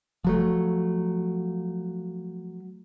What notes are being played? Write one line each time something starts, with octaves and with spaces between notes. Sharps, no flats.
F3 F#3 A3